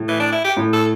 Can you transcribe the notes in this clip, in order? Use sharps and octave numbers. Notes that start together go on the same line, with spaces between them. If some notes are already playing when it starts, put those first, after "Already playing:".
Already playing: A2
E3
D4
E4
G4
A2
A4